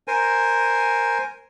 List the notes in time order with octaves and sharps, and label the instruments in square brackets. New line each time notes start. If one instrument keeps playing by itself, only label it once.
[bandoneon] A#4 C5 G#5